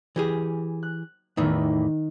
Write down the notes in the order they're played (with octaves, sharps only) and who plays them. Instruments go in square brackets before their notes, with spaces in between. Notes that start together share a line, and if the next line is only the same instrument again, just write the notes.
[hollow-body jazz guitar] E3 G4 G#4
[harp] F#6
[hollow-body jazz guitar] E2 A2 E3 [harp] D#3 D#4